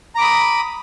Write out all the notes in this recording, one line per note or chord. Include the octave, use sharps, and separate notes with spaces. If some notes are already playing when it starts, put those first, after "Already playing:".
A#5 B5 D6 D#6